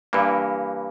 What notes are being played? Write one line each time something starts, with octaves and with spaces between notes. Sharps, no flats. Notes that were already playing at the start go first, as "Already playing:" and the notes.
G2 E3 A#3